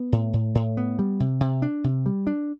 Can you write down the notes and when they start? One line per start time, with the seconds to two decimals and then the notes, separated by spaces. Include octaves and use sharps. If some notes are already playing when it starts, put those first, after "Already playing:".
Already playing: B3
0.12 A2
0.33 A2
0.55 A2
0.77 B3
0.99 G3
1.20 C3
1.41 C3
1.62 D4
1.84 C3
2.06 G3
2.27 D4